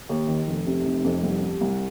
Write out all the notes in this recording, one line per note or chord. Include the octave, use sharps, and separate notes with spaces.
D#2
D#3
F1
C3
F1
F2
C2
G3
C2